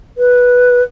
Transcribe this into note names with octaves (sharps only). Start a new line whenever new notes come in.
B4